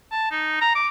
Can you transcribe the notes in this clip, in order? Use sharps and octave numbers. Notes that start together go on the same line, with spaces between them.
A5
D#4
A#5
D6